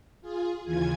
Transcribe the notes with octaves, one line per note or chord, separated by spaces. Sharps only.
F4 G#4
D#2 C#3 E3 F4 G#5 G#6